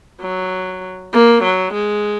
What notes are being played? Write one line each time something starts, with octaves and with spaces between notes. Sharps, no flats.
F#3
A#3
F#3
G#3